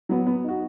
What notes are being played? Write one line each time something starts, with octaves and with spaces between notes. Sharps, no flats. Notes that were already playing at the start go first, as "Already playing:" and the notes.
F#3 B3
B3
D#4 F#4